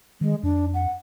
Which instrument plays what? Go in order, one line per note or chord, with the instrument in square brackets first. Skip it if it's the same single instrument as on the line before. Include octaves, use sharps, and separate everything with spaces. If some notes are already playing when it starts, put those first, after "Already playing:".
[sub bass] D#3 [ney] G#3
[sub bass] F2 [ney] D4
[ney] F#5